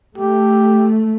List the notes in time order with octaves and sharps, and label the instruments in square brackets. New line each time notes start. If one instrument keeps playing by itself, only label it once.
[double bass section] A3 [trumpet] G4